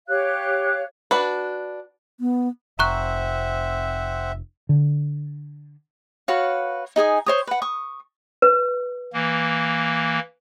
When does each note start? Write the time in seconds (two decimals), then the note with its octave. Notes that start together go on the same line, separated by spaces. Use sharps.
0.09 G4 C#5 F5 F#6
1.11 D4 F#4 B4
2.20 B3
2.79 F1 C4 C5 E5 F#5 A#5 C#6 F#6
4.69 D3
6.28 F#4 B4 C#5 F5
6.96 D#4 G#4 G#5 D#6
7.26 C5 C#5 D#6
7.47 B4 F#5
7.62 C#6 D#6
8.42 B4
9.13 E3 A#3